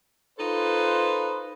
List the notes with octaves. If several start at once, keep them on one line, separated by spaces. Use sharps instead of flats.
D#4 F4 A4 B4 C5